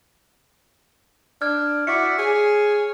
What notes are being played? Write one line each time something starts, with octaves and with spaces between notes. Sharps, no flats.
D4 F6 G#6
E4 F#4 D5 E5 C#7
G#4 C#5